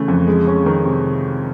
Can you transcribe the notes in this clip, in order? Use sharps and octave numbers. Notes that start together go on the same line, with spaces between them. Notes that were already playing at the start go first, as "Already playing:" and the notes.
Already playing: C#3 E3 A3
F2
G#3
C#4
D#3
C3